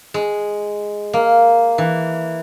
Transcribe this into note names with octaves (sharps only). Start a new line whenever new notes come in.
G#3
A#3
E3